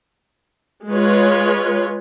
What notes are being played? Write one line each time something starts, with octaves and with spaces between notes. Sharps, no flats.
G#3 F4 B4 C#5